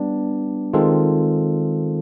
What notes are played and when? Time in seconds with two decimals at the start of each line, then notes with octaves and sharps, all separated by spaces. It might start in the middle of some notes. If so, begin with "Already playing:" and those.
Already playing: G3 B3 D4
0.73 D#3 G#3 C4 F4 A4